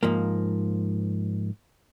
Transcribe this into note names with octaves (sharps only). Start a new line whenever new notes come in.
G#2 F3 A#3